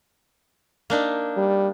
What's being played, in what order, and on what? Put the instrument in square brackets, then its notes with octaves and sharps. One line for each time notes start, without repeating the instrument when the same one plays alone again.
[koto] A#3 D4 D#4
[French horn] G3